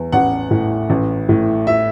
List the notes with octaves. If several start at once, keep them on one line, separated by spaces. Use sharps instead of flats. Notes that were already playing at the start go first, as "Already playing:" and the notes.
Already playing: E2
A1 F#5
A2
A1
A2
E5